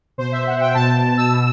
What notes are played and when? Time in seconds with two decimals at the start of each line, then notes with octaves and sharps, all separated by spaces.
0.18 B2 C5
0.32 E5
0.47 F#5
0.60 G5
0.74 B2 A5
1.17 E6
1.31 B2